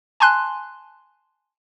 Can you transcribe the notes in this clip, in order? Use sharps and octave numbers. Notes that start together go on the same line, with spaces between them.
G#5 A5 C6 F#6